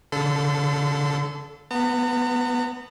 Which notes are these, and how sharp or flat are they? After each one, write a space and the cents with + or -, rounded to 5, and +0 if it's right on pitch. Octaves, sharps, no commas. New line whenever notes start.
D3 -45 A4 +0 C6 -40
B3 +0 A#5 -45